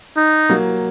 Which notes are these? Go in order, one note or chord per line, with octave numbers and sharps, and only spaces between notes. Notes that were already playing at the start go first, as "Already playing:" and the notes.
D#4
F#3 A#3